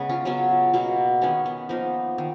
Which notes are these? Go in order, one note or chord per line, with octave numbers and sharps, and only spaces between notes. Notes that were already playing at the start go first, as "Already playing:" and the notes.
Already playing: C#3 G#3 B3 G#4 B4
C#4 F4
C#3 F#3 B3 C#4 F4
B2 F#3 A#3
D#3 G#3 B3 C#4
B3
F3 A#3 B3 D#4
D#3